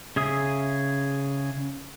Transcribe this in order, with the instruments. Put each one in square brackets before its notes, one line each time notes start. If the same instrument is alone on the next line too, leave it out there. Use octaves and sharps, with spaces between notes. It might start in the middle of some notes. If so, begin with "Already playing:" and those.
[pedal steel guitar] C#3 G#4 E5 D#6